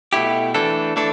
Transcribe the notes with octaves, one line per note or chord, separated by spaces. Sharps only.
B2 A3 E4 G4
E3 A3 D4 A4
E3 A3 D4 A4